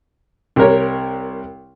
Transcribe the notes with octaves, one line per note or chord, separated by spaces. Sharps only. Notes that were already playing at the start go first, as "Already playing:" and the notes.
C2 G4 A#4 C#5